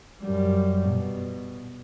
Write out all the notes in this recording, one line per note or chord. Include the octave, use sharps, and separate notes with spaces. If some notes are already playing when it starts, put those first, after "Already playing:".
F#2 G3
B2